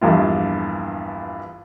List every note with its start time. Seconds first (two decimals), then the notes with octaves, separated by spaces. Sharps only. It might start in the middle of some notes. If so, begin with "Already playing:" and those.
0.01 A#1 E2 G2 F4